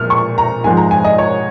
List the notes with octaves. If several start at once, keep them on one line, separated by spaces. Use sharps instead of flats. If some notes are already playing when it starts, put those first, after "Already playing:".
Already playing: A#2 F3 G#3 F6
C#6
A#5
G#2 F3 G#3 G#5
A#5
G#5
D#5
C#5